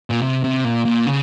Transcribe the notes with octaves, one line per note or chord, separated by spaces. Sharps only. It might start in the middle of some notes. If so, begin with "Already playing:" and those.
A#2
C3
C3
A#2
A#2
C#3